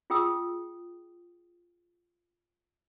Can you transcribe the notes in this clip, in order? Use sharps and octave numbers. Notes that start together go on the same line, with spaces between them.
F4 G#4 G5 D#6 E6